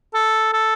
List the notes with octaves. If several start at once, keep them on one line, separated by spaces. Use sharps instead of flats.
A4
A4